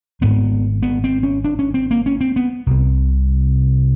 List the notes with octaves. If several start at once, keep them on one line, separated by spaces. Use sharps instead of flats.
G#1 G#2 B3
B3
C4
C#4
D4
C#4
C4
A#3
C#4
C4
B3
C2 C3